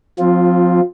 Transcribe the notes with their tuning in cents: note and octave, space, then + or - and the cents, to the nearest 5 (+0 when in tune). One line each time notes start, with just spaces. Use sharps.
F3 +30 C4 +0 F4 +0